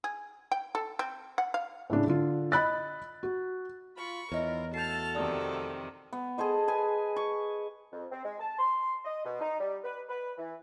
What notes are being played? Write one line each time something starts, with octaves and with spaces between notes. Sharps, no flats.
G#4
G5
A4
C4
F#5
F5
A2 C#3 D4
D3 F4
D#5 B5 F#6 A6
F#4
F4 B5 C#6
E2 D#3 E4 F4 A#4 C#5 D#5
A3 F#4 A4 A5 F6 G6 C7
F2 C3 D#3 D5 A5 D#6
B3
G#4 A4 C5 D#5
G#4 B4 G#5
C#6
F2
C4
G#3
A5
C6
D#5
B2
D#4
G3
B4
B4
E3